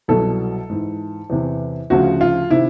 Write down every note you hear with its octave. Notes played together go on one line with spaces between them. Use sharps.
C2 B2 F#3 A4
G#2 E3
E2 C3 E3
D2 C#3 F3 F#4
F4
C3 D#3 E4